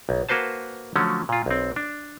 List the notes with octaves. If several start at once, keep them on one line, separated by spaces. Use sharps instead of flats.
B1
A#3 F#4 B4 C5 A5
D3 F3 F#3 A3 C#4
A#2 F4
B1 C4
D4